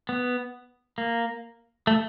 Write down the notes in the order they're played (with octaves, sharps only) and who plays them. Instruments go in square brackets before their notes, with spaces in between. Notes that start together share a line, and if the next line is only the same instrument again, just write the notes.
[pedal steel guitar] B3
A#3
A3